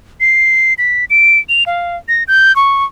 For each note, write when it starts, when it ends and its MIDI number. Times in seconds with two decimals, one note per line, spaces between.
0.21 0.74 96
0.78 1.05 95
1.10 1.39 98
1.49 1.63 101
1.66 1.97 77
2.08 2.24 94
2.28 2.55 91
2.56 2.85 85